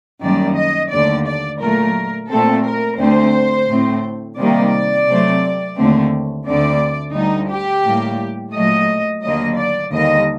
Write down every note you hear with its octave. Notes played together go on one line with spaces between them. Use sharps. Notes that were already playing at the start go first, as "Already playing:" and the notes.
F#2 D#3 G3 A#3 D5
D#5
D#2 D3 A3 D5
D5
A#2 F#3 A3 A#4
A#2 A3 C4 A4
A#4
D2 D3 A3 C4 C5
A2 A3 C4
C3 D#3 G3 A#3 D5
C3 F#3 A3 C4
D#2 D3 A3 C4
D2 D3 A3 C4 D5
D2 D3 G3 D#4
G4
A2 G3 A#3
A#2 F#3 A3 D#5
D#2 D3 F#3 A#3 D#5
D5
D#2 D3 G3 A#3 D#5